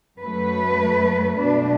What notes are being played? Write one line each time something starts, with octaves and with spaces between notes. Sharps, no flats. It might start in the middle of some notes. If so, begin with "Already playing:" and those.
F#2 F#3 A3 B4
B2 A3 D4